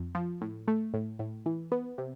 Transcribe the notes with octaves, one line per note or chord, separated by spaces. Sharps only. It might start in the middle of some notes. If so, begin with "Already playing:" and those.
Already playing: F2
F3
A2
A3
A2
A2
E3
B3
C3